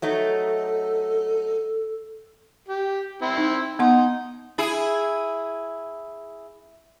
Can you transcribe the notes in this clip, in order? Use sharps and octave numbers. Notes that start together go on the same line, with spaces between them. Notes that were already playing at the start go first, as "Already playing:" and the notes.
F#3 A3 D#4 A4
G4
C4 E4
D#4
B3 D#4 F#5 C6
E4 G#4